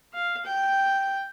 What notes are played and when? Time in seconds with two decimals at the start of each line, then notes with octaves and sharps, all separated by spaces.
0.13 F5
0.46 G5